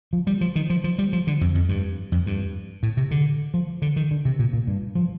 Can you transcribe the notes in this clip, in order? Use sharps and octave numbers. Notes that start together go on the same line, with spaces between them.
F3
G3
F3
D#3
F3
F3
G3
F3
D3
F2
F2
G2
F2
G2
A2
C3
D3
F3
D3
D#3
D3
C3
A#2
A#2
G2
F3